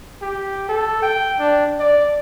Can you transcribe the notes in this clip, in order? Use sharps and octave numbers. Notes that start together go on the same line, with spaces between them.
G4
A4
G5
D4
D5